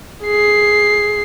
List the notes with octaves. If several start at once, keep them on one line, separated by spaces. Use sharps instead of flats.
G#4 C7